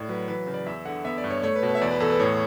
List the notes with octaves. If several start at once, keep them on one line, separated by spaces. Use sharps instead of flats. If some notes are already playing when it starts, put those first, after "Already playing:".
Already playing: A2 D5
F#3 B4
E3 B4
C#3
D5
E2 E5
D3 F#5
B3 E5
D5
G2
C#5
A3 C#5
B4
B2
B4
E5
E2 D5
B4
E2 A4
B4
A2 C#5